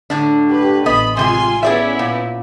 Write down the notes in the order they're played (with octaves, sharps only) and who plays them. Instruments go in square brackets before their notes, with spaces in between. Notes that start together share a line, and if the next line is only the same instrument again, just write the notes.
[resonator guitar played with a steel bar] A2 D3 D4
[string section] G4 B4
[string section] A1 B5 [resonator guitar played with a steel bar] B3 D#5
[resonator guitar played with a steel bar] C3 G3 G#3 [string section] F4 G#5 C6
[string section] B3 C#4 E4 [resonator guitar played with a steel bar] G#4 D5 E5
[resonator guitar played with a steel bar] A#2